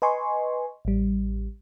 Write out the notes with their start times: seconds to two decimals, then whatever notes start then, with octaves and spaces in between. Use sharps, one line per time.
0.02 B4 D#5 G#5 C6 C#6
0.85 A1 G3